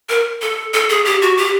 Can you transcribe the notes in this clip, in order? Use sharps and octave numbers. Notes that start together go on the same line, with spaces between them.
A#4
A4
A4
G#4
G4
F#4
G4